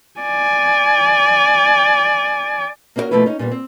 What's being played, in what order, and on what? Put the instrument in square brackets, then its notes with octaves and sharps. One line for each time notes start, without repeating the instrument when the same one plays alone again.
[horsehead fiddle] D5 G#5
[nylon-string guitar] A#3 B3 C#4 E4 F#4 A#4
B2 F3 A3 A#3 E4 B4
C#4 D#4
A#2 G3 B3
C4